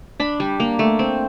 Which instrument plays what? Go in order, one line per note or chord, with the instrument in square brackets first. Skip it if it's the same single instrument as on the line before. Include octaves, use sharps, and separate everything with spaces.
[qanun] D4 B5
G3
A#3
A3
C4